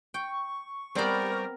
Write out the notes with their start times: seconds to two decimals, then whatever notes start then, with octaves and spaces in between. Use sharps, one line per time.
0.14 G5 C#6
0.95 G3 B3 C4 A#4 C5 D5